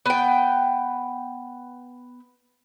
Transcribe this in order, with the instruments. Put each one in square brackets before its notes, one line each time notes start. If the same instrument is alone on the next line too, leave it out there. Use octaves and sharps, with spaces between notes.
[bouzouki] B3 G5